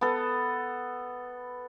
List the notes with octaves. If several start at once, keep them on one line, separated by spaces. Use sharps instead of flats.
B3 A4